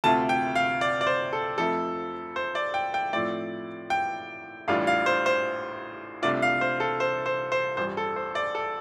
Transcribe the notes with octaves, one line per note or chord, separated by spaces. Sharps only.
D2 C3 A3 F4 A5
G5
F5
D5
D5
C5
A4
F1 F2 F3 A3 A4
C5
D5
G5
G5
A2 F3 A3 C4 D5
G5
A1 A2 G3 D4 F4 F5
F5
C5
C5
C2 C3 A3 D4 F4 D5
F5
C5
A4
C5
C5
C5
A1 G2 G3 F4 C5
A4
C5
D5
A4